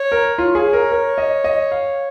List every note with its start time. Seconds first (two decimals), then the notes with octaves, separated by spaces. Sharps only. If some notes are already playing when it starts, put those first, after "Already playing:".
Already playing: C#5
0.12 A#4
0.38 F4 C#5
0.55 G#4
0.73 A#4
0.92 A#4
1.18 D#5
1.44 D#5
1.72 F5